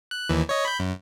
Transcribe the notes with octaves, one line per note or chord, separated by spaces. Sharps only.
F#6
D#2 E3
C#5 D#5
B5 G6
F#2